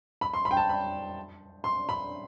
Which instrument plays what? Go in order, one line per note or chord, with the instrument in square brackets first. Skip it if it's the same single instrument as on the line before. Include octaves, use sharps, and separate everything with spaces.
[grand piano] B5
C6
B5
G5
A5
B5
C6
B5